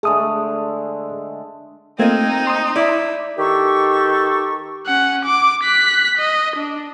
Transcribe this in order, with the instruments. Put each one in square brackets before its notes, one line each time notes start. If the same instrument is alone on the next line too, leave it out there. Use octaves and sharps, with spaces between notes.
[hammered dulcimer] D3 G#3 A3 [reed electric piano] G#4 D#6
[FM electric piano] A3 A#3 G#6 [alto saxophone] C4 [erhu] D#4 [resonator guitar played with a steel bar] F4 D#5
[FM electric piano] C6 D#6
[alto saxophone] E4 [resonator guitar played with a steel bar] D5
[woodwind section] D#3 G4 A4 C#6
[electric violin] C#4 F#5
D6
F#6 B6
D#5
D4